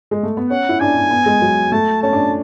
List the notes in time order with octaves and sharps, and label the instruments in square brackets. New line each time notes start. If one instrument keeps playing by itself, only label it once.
[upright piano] G#3
A3
B3
[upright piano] C#4 [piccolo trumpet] F#5
[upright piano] E4
[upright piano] D4 [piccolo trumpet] G#5
[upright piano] D4
B3
G#3
F#3
[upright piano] A3 [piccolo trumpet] A5
[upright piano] C#4 [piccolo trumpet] A5
[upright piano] D4